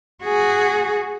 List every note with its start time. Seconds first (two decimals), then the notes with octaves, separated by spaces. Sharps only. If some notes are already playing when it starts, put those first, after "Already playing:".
0.24 F#4 G#4